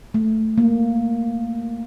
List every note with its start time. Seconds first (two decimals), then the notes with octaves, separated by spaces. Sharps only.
0.14 A3
0.58 A#3